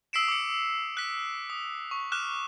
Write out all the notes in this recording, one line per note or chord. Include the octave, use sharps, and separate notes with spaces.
D#6 E6 B6 C7 D7 E7
D6 C#7
F#6 B6
D#6
C#6
D6 F6 F#6 E7